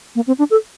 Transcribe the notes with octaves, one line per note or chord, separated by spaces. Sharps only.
A#3
C4
D4
A4